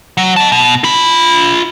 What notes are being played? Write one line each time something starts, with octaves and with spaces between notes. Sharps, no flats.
F#3
D#5 A5
B2
F4 B5